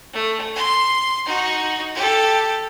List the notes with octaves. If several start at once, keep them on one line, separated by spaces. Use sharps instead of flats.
A3
C6
D#4 F#4
G4 A4